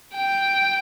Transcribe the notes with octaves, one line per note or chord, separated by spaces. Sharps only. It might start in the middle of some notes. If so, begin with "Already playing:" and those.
G5